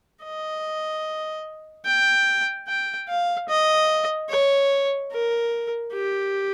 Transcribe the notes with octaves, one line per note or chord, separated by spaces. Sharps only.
D#5
G5
G5
F5
D#5
C#5
A#4
G4